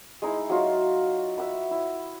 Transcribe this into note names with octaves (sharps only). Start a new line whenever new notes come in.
G#3 D#4 E4
F#3 D#4 F4
E5 F#5 B5
E4